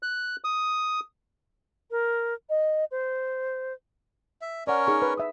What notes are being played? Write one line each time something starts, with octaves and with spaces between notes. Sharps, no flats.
F#6
D#6
A#4
D#5
C5
E5
C#4 A#4 C#5 D5 F#5
D#4 G#4 C#6
B4
E5 D#6